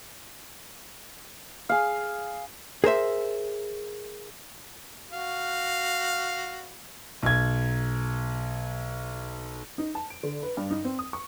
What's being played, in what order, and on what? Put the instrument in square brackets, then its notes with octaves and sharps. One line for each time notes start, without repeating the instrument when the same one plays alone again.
[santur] G#4 F5
[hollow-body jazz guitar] G#4 A#4 C5 E5
[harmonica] F#4 F5
[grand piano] B1 G#6
[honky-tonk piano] D#4
A5
D7
D3
B4
G2
D#4
C4
D#6
C#6